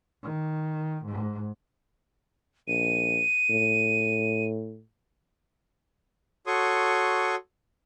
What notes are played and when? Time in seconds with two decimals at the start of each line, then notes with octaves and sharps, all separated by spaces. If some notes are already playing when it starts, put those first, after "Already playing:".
0.23 D#3
1.06 G#2
2.68 A#1 D#7
3.50 A2
6.47 F#4 A4 C#5 C6 C#6 D#6